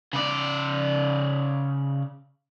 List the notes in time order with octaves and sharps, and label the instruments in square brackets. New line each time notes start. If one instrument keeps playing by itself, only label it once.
[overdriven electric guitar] C#3 D5